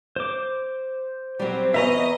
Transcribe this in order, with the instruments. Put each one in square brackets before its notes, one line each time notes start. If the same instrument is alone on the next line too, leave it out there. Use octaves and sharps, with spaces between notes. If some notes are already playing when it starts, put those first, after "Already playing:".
[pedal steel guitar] C5 D6
[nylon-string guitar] F#3 G3 [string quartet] C4
[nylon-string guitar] E2 B4 [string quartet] D#5 [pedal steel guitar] E5 A#5 C#6